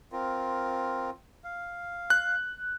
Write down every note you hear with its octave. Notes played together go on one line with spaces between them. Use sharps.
C4 F4 A#4
F5
F#6